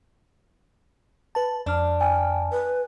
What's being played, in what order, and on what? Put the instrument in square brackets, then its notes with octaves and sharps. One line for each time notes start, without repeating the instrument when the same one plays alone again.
[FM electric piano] B4 A5
[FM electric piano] F2 F6 [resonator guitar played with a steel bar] D4
[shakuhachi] G5 [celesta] G#5
[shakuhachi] B4